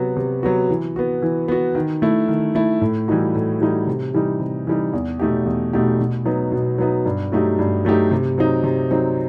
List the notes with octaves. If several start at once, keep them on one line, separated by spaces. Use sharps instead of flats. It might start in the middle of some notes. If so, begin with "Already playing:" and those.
Already playing: C3 F#3 B3 F#4
C3
F#3 B3 F#4
E3
B3 F#4
E3
B3 F#4
D#3
A3 E4
D#3
A3 E4
A2
E3 G3 D#4 F#4
A2
E3 G3 D#4 F#4
C3
E3 G3 D#4
C3
E3 G3 D#4
E2
B2 A3 D#4 G4
E2
B2 A3 D#4 G4
B2
F#3 B3 D#4
B2
F#3 B3 D#4
G2
F#3 A3 D#4 G4
G2
F#3 A3 D#4 G4
C3
F#3 C4 D#4
C3
F#3 C4 D#4